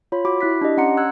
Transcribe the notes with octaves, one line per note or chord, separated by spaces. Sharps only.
F4 C#5 B5
F#4 B5 D6
E4 F#6 B6
D4 G4 D#5
C#4 F#5 A#5 C6 C#7
E6 F#6 G#6